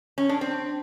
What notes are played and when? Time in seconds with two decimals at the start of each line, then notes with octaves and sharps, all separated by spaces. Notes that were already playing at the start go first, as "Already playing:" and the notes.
0.18 C#4
0.29 D4
0.41 C4